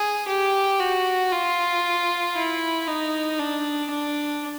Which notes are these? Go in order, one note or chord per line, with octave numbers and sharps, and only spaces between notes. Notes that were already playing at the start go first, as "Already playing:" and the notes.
Already playing: G#4
G4
F#4
F4
E4
D#4
D4
D4